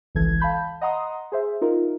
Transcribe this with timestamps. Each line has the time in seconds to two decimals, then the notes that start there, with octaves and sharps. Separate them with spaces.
0.15 G#1 C#2 E3 A4 G#6
0.40 F5 A5 B5 G6
0.81 D#5 F#5 A#5 C6 D#6
1.32 G#4 C5 E5
1.61 D#4 F4 A#4